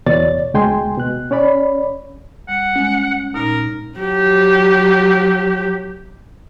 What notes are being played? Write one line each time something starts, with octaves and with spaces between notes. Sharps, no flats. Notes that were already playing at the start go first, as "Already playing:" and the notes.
E2 B2 C#5 D5 A6
D2 B2 G#3 G5 G#5 C6
B2 F#6
C#4 C#5 D5 B5
G3 F#5
G#3 C#4
A#2 D#4 A#4
F#3 G4